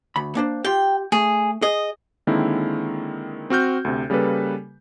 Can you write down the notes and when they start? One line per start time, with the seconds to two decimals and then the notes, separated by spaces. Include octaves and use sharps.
0.16 D2 B5
0.35 A#3 D4 C5
0.65 F4 G4 G5
1.12 A3 G#4
1.62 G#4 D#5
2.27 D3 D#3 G#3 A#3 C4 E4
3.50 C4 F#4 F6 G6
3.85 D2 C3
4.10 C#3 G3 A#3 A4 B4